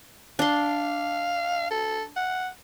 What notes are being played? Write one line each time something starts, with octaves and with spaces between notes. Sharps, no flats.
D4 F5 C6
A4
F#5